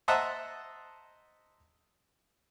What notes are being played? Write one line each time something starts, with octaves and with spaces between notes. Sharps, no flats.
C5 D#5 E5 F#5 A5 A#5